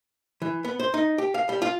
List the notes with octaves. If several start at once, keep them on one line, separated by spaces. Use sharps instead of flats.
E3
B3
C5
D#4
G4
F5
G3
F4